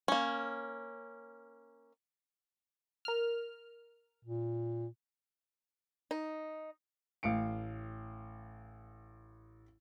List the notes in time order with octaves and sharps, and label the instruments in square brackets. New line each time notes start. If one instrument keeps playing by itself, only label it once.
[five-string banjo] A#3 C#4
[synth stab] A#4 F6
[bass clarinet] A#2
[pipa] D#4
[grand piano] A1 F5 C#7 D7